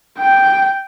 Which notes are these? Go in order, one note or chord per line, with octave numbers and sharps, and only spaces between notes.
G5